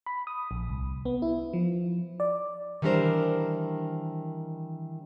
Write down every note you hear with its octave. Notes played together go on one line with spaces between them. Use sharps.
B5
D#6
A#1
C2
B3
E4
F3
D5
D#3 E3 G3 D4 A#4 C5